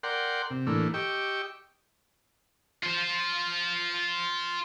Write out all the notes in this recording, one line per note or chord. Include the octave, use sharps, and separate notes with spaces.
A#4 D5 F#5 G5 C6
C3
A2 E3 A3 A#3 D4
G4 D#5 G5 C#6 D6 E6
F4 C5